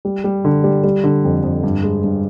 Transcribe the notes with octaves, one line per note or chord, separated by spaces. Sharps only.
G3
G3
D3
G3
G3
D3
F2
F2
G2
G#3
G2